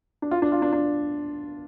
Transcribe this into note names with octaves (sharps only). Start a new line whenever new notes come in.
D4
F4
D4
F4
D4
D4